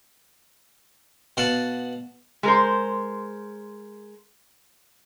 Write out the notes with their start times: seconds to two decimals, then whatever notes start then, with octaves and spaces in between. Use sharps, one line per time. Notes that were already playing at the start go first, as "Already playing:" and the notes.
1.37 B2 F5 F#5 A5
2.43 G#3 A#4 C5